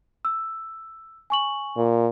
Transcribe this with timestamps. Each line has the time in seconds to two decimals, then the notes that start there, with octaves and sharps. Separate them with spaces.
0.25 E6
1.30 G#5 C#6 F#7
1.77 A#2